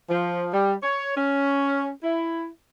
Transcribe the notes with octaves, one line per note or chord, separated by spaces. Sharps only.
F3
G3
C#5
C#4
E4